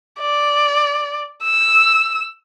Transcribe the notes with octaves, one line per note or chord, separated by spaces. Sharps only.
D5
E6